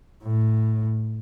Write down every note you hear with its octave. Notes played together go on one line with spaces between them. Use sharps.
A2